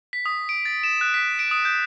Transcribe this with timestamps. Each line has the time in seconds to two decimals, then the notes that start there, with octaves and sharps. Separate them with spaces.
0.13 B6
0.26 D#6
0.49 D7
0.65 A6
0.83 E7
1.01 F#6
1.14 B6
1.39 D7
1.51 D#6
1.65 G6